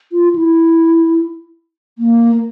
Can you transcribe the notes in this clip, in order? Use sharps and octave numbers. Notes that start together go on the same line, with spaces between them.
F4
E4
A#3